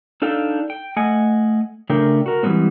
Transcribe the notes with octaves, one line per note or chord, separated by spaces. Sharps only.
D4 D#4 A4 F5 G5
G5
A3 D#5 F#5 G#5
C#3 A3 D4 A#4 G5
F#4 A#4
E3 G3 G#3 B3 C4